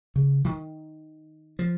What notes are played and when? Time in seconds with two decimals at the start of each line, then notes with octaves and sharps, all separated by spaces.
0.16 C#3
0.44 D#3
1.59 F3